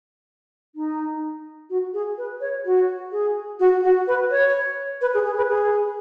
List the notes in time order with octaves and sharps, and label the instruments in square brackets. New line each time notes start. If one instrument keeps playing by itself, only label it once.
[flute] D#4
F#4
G#4
B4
C#5
F#4
G#4
F#4
F#4
B4
C#5
B4
G#4
G#4
B4
G#4